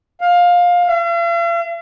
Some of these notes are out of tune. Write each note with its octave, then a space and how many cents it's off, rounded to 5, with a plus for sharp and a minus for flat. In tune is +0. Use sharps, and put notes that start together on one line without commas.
F5 +20
F5 -45